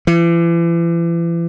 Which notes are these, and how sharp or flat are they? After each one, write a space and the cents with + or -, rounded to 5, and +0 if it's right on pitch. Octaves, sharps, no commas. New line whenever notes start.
E3 +40